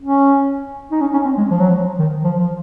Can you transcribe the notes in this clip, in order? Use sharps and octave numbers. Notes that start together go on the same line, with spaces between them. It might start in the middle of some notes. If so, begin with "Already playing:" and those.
C#4
D#4
C#4
C#4
C4
G#3
F3
F#3
F3
D#3
F3
F3